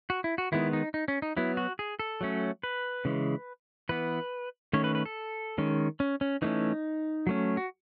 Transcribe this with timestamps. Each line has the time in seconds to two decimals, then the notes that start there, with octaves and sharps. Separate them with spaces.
0.10 F#4
0.24 E4
0.38 F#4
0.52 D#3 G#3 B3 E4
0.73 D#4
0.94 D#4
1.08 C#4
1.22 D#4
1.37 F#3 B3 E4
1.57 F#4
1.79 G#4
1.99 A4
2.21 F#3 A3 C#4
2.63 B4
3.05 C#3 E3 G#3
3.89 E3 B3 B4
4.73 D#3 A3 C#4 C#5
4.84 B4
4.95 B4
5.06 A4
5.58 D#3 G#3 C#4
6.00 C#4
6.21 C#4
6.42 E3 A3 C#4 D#4
7.27 F#3 A3 C#4
7.57 F#4